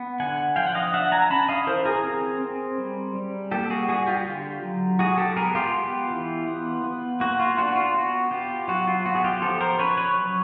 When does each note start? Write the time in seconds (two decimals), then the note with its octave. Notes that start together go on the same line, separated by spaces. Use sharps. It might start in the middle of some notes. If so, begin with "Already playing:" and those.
Already playing: B3
0.20 D3 F#5 G#5
0.56 F3 F5 G5
0.67 F#5
0.75 D#5 F5
0.93 D4 E5 F#5
1.12 G#5 A#5
1.30 C#4 A5 B5
1.48 D#5 F5
1.67 E3 A#4 C5
1.85 G#4 A#4
2.04 C4
2.40 C4
2.78 G3
3.15 G3
3.51 A#3 G4 A4
3.70 F#4 G#4
3.88 G3 F#4 G#4
4.07 F4 G4
4.25 D3
4.63 F#3
4.99 G#3 F#4 G#4
5.18 G4 A4
5.37 B3 G#4 A#4
5.55 F4 G4
5.73 B3
6.11 E3
6.48 B3
6.84 B3
7.20 A#3 F#4
7.40 F4
7.58 D4 F#4
7.76 F4
7.94 B3 F#4
8.31 B3 F4 G4
8.68 F#3 F#4
8.87 F4
9.06 B3 F#4
9.15 G#4
9.24 F4 G4
9.42 F3 G4 A4
9.60 A#4 C5
9.79 C#4 B4 C#5
9.97 B4 C#5
10.16 F#3